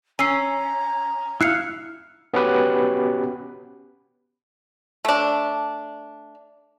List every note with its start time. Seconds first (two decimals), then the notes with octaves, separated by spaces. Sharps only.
0.19 C#4 G#5 A#5 E6 C7
1.41 E4 F5 F#6 C7 C#7
2.34 B3 C#4 F#4 G4 B4
5.05 A3 D4